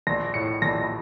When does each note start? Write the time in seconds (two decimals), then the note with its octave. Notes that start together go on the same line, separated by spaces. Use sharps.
0.07 A#1 A#6
0.34 A2 C#7
0.62 A#1 A#6